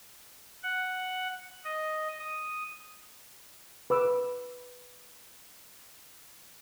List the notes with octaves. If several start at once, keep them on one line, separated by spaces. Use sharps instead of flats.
F#5
D#5
D#6
B4 D6 E6